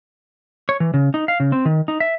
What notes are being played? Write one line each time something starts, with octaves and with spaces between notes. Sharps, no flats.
C#5
E3
C#3
D#4
F5
C#3
C4
D#3
D#4
E5